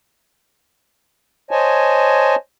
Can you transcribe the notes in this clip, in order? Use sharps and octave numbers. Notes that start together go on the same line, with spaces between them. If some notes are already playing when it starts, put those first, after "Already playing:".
C5 C#5 D#5 G#5 A5